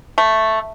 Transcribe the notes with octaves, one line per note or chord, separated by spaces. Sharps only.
A3